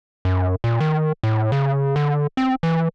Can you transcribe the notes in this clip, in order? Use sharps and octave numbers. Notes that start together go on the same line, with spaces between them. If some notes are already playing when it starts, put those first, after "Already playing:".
F#2
A#2
D#3
A2
C#3
D3
C4
E3